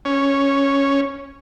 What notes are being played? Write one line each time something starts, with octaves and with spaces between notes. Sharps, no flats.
C#4